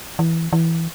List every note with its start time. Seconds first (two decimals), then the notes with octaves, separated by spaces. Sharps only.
0.19 E3
0.53 E3